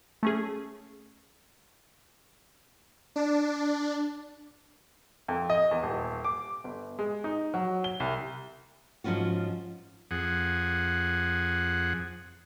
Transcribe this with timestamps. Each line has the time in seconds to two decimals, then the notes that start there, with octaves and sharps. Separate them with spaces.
0.23 A3 C#4 G#4
3.16 D4
5.28 F2
5.50 D#5
5.71 E2
5.83 D#1
6.24 D6
6.64 G1
6.99 G#3
7.24 D#4
7.54 F#3
7.84 G7
8.00 C2
9.04 G#2 F3 C#4 F4 F#4
10.11 F2 G#4 F#5